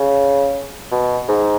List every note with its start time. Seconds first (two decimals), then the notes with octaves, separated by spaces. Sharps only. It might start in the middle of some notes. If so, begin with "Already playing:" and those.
Already playing: C#3
0.91 B2
1.28 G#2